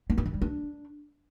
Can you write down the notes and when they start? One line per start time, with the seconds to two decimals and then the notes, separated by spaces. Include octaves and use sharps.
0.10 B3
0.18 D#4
0.26 D#3
0.34 G3
0.42 D4